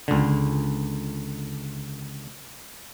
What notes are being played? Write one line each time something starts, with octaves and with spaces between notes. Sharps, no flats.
C#2 D3